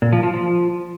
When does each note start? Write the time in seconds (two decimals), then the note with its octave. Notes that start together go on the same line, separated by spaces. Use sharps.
0.02 A#2
0.13 F3
0.23 F3
0.34 F3